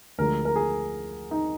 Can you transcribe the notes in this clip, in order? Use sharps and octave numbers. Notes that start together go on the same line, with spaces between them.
D2 D3 F3 G#3 A#4
A#4
G#4
D#4